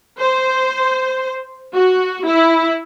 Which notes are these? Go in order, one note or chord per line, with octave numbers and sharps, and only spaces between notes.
C5
F#4
E4